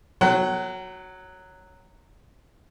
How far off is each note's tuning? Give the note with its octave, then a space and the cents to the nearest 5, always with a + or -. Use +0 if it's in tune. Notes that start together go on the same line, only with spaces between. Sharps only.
F#3 +0 A4 +45 F#5 +35